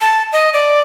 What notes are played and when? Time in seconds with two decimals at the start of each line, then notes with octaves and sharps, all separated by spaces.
0.01 A5
0.32 D#5
0.54 D5